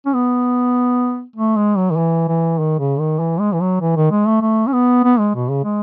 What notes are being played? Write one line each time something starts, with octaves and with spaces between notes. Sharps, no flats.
C#4
B3
A3
G#3
F#3
D#3
E3
E3
D#3
C#3
D#3
E3
G#3
E3
F#3
E3
D#3
G#3
A3
A3
C#4
B3
B3
G#3
B2
C#3
G#3